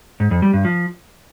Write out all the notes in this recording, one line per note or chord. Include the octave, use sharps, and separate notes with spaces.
G#2
F2
G3
G2
F3